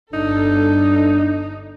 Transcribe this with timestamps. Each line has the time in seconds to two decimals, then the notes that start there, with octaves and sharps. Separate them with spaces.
0.14 G1 D4 D#4 A4